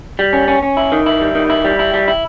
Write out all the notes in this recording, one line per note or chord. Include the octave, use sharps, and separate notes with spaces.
G3
C#4
C#4
C#4
E4
D#3
E4
G3
D#3
E4
G3
E4
G3
E4